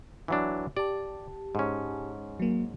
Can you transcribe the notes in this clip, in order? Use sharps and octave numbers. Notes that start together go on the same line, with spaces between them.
E3 F#3 D4
G4 D5 A5
G#2 C#4
F#3 A#3